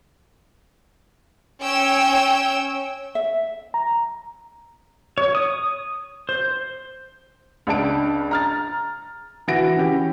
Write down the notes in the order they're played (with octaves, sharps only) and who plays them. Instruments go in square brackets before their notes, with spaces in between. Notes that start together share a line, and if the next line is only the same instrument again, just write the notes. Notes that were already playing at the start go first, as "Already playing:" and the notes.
[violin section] C#4 C#5 G5 E6
[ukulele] E5
[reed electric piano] A#5
[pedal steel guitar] C#5
D#6
C5
[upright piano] C#2 C#3 D4 A5 D7
A#5 F6 A6
E3 F#4 E5 A#6 D7
E3 C#4 G4